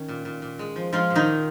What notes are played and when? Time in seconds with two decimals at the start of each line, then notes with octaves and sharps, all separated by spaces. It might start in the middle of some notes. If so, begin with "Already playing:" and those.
Already playing: D#3 C#4
0.08 A#2
0.25 A#2
0.42 A#2
0.59 G#3
0.76 F3
0.93 F3 G#3 F4
1.10 A#2
1.15 D#3 D#4
1.26 A#2